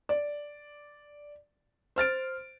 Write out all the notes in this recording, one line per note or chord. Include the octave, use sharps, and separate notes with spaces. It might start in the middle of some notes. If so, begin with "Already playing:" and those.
D5
C5 F6 A6 D7